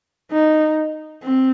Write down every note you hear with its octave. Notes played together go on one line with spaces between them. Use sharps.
D#4
C4